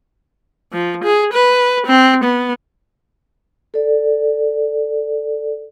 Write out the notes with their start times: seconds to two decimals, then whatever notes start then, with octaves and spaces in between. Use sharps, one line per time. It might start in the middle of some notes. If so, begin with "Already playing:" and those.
0.72 F3
1.04 G#4
1.33 B4
1.86 C4
2.24 B3
3.74 A4 D5